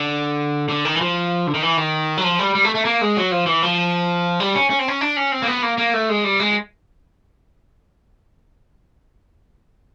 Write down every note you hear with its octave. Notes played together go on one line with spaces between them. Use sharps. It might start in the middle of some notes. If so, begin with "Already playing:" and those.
Already playing: D3
D3
D#3
E3
F3
D3
D#3
E3
D#3
F#3
F3
G3
G3
A3
A3
A#3
G#3
F#3
F3
E3
F3
G3
C#4
C#4
C4
C#4
D4
C#4
C4
A#3
B3
A#3
A#3
A3
G#3
G3
G#3